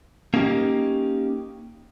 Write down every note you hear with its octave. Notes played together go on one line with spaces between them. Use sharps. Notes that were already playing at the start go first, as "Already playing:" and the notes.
A#3 C#4 D#4 G4